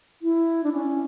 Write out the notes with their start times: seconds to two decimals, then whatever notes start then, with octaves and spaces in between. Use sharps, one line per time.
0.22 E4
0.64 D4
0.73 C#4